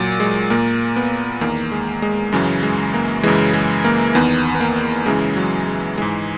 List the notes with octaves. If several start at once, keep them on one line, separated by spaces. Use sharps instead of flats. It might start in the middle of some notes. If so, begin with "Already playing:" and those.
Already playing: A#2 F#3
G#3
A#2 A#3
B3
E2 D#3 A#3
G#3
G#3
F#2 C#3 E3 F#3
G#3
A#3
F#2 C#3 E3 G#3
G#3
A#3
E2 D#3 B3
B3
A#3
F#2 C#3 E3 G#3
F#3
G#3
G#2 E3 G#3